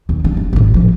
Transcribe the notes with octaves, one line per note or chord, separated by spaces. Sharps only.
D#2
D4
G#3
G#1 A2
F3